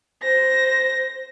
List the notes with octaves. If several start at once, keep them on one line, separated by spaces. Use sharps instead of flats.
C5 A#6